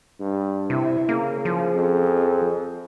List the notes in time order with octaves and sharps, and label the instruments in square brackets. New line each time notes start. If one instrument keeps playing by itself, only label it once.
[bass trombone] G2
[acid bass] C3 [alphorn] E4
[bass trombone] C#3 [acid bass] A#3
[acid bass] F3 [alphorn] G#4
[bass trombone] F2